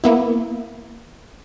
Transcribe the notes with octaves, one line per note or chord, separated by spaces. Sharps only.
A#3 B3 E4